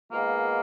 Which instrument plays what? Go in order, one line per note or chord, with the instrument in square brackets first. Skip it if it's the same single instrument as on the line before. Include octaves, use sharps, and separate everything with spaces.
[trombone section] D#3 G#3 B3 F4 G#4 [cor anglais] A#3